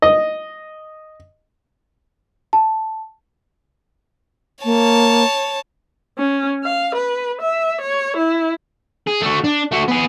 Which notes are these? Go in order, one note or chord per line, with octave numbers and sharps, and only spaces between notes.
D#5
A5
A#3 C#5 A5
C#4
F5
B4
E5
C#5
E4
G#4
A3 F#4
D4
A3 F#4
B3 G#4